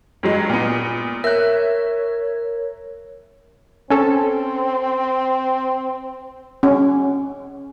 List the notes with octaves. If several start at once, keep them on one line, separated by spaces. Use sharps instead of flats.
G2 F#3 G#3
A#2 B3
A#4 C#5 E5 F#6
C4 C#4 A4
C#4